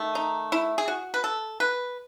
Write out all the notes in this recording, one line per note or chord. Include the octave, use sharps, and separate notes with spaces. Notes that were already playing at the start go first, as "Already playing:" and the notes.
Already playing: D#3 A3
D#4
E4
G#4
F#4
B4
A4
B4